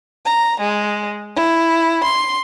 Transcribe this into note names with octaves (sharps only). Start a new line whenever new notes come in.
A#5
G#3
E4
C6